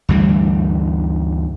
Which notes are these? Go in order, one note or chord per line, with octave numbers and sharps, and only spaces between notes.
D2 G2 E3 G3